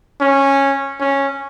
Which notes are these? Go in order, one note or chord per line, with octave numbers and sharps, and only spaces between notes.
C#4
C#4